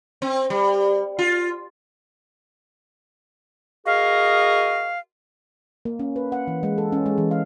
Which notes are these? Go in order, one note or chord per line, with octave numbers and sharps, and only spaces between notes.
C4
G3
F4
F#4 G#4 A#4 D#5 F5
A#3
C#4
B4
F#5
E3
G#3
A4
C#4
G#3
E3
F5